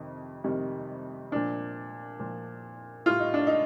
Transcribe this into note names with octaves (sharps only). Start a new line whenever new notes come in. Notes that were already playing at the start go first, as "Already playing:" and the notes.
Already playing: F2 C3 D#3
F2 C3 D#3 G3
A#2 F3 D4
A#2 F3
A2 G3 F4
D#4
D4
D#4